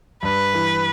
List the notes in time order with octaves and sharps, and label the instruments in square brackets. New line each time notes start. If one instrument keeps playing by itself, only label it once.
[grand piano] G2 [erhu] B4
[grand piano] E3